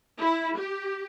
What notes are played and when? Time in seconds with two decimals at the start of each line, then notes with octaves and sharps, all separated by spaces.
0.18 E4
0.56 G4